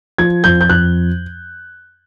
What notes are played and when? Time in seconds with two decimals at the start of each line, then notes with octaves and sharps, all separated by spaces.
0.18 F3 G#6
0.44 F2 G6
0.61 G6
0.69 F2 F#6